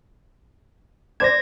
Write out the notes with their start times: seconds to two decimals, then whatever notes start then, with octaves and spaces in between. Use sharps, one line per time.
1.20 C5 D5 G#6 A#6 E7